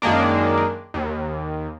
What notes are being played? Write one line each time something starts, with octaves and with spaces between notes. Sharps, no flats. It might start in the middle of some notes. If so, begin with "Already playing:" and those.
F#2 D#3 G#3 A#3 D4
D#2